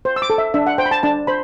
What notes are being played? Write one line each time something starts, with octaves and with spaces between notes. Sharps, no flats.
C5
E6
D6
A4
E5
D4 E5
F#5
C5 G5
B5
A5
D4 A5
C5 B5